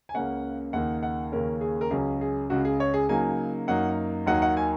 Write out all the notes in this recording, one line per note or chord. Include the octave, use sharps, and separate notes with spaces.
G#5
C#2 C#3 A#3 C#4 F#5
D#2 C#3 A#3 D#4 F#5
F#5
D#2 C#3 A#3 C#4 A#4
G#4
A#4
C#2 C#3 F#3 C#4 G#4
G#4
C#2 C#3 G#3 F#4
G#4
C#5
G#4
C#3 F#3 A#3 D#4 G#5
F#2 F#3 A#3 D#4 F#5
D#2 D#3 F#3 A#3 D#4 F#5
F#5
G#5